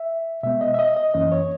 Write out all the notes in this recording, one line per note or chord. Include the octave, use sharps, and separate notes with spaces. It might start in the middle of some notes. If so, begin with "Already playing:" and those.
Already playing: E5
B2 G#3 B3 E5
D#5
E5
D#5
D#5
F#2 E3 A#3 C#4 D#5
C#5